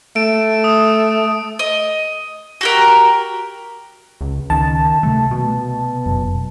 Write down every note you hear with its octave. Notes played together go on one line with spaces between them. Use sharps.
A3 D7
D#6
D#5
F#4 G4 A#4
C#2
C#2 D#3 C#4 A5
C3 G3 A3
B2
F1 F#2